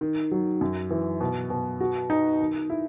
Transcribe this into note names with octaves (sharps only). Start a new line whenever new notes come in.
D#3
F#3
F#2
E3
B2
B2
F#4
D#4
D#3
E4